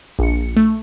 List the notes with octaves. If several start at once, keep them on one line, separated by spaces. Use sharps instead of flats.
A#1 C#7
A3